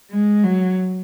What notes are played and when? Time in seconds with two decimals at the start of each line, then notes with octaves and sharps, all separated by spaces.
0.11 G#3
0.43 F#3